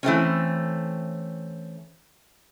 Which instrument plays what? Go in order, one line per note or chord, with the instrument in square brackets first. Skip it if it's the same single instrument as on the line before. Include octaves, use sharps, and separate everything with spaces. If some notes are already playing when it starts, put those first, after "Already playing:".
[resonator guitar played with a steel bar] E3 A3 C4 C#4